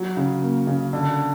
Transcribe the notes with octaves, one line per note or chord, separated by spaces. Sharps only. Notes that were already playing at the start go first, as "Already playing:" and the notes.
Already playing: F#3
C#3
A#3
C#3
D3